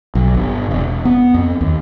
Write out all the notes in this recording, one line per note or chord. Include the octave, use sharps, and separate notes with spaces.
B1
G1
E1
B3
F2
D#2